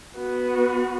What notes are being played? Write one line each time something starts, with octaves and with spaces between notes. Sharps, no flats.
B3 F#4